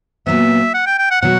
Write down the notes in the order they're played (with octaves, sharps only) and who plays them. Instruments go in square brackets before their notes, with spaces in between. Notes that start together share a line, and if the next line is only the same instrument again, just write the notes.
[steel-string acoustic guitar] A#2 F#3 B3 [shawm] E5
[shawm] F#5
G5
G5
F#5
[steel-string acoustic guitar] B2 F#3 [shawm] F#5